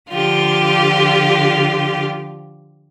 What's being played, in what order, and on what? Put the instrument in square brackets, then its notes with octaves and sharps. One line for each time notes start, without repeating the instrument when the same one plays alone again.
[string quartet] D3 F3 F4 G4